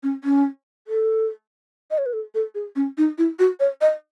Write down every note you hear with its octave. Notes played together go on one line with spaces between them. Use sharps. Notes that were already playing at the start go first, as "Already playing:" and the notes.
C#4
C#4
A4
D#5
C#5
B4
A4
A4
G#4
C#4
D#4
E4
F#4
C#5
D#5